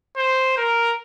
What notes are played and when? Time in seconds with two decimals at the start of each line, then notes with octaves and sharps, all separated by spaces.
0.17 C5
0.57 A#4